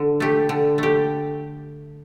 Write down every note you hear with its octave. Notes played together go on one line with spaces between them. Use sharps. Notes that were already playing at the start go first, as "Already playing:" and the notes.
Already playing: D3
A3 G4
D3
A3 G4